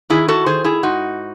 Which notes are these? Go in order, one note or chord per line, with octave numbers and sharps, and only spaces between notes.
D#3 E4 G#4
F#4 A4
D#3 G#4 C5
E4 G#4
G#2 D#4 F#4